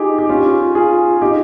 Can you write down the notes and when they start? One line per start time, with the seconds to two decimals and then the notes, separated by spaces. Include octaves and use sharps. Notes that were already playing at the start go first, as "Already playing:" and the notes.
Already playing: D#4 F4 G4 G#4
0.18 G4
0.29 C#4 F4
0.75 F4 G#4
1.22 D#4 G4